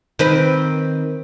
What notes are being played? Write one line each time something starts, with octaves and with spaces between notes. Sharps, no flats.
D#3 C4 B4